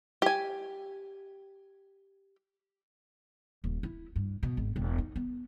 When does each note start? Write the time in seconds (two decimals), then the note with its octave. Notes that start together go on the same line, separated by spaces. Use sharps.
0.22 G4 G#5
3.64 D#1
3.83 E4
4.16 G2
4.43 B2
4.57 G#1
4.76 E1
4.98 D#4
5.16 B3